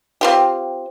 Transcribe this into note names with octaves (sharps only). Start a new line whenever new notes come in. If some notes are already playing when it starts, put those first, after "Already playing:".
C4 F4 G4